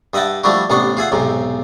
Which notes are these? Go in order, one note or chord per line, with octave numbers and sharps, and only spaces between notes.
G2 D#5 E5 F#5 G5 A5
F3 G3 A3 D4 E4 F#4
A1 C3 B3 D4 F#5 C#6
F4 G#4 E5 F#5
B1 E2 G#2 C3